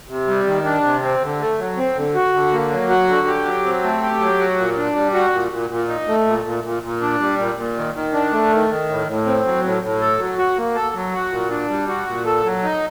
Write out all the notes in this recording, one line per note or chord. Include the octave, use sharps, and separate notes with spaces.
C3
G3
D#3
D4
C3
C4
D3
A3
F#3
C4
D3
F#4
D3
A#3
F#3
F#4
D3
G4
F#3
C4
A3
G4
F#3
F#4
A#2
D4
G3
F#4
A#2
A#2
A#2
D#4
A3
A#2
A#2
A#2
A#2
D4
G3
A#2
A#2
D#3
D#3
D4
A3
D#3
D#3
A2
A2
C4
F#3
A2
A2
A4
F#3
F#4
A#3
A4
F#3
F#4
A#2
D4
G3
F#4
A#2
A4
F#3
D#4